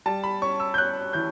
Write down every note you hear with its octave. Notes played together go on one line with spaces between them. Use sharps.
G3 A5
B5
C#4 C#6
E6
G6
C#4 F#6
E3 G6